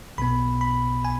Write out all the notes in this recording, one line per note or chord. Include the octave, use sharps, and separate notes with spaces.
B1 B2 B3 B5
B5
G#5